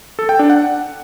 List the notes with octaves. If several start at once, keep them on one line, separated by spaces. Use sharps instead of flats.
A4
G5
D4
F#5